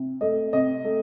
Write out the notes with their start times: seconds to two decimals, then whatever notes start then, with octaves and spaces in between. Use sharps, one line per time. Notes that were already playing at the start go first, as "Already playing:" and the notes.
Already playing: C3
0.21 A3 D#5
0.53 C3 D#5
0.84 A3